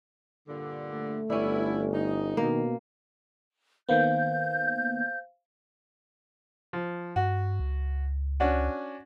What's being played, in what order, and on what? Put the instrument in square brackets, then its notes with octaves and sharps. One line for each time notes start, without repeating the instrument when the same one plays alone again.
[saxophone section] G2 A#2 D3
[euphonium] A3
[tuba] G1 [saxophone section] B3 E4 [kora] C#4 D4
[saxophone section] D#4
[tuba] B2 [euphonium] D#3 [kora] A#3
[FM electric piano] D#3 A#3 B3 [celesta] C5 F5 [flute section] G6
[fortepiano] F3
[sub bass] G2 [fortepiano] F#4
[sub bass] C#2
[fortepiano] C#4 D4 F#4